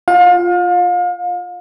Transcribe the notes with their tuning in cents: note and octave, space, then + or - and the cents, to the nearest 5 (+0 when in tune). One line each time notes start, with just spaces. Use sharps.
F4 +0 F5 +35